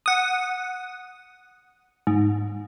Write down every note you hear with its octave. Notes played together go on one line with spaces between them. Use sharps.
F#5 D#6
G#2